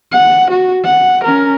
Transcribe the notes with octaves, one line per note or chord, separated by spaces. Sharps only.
F#5
F#4
F#5
C#4 A#4